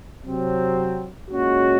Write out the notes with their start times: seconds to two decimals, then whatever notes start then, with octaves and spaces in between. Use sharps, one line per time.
0.25 C3 F#3 C4
1.30 A#2 G#3 C#4 F#4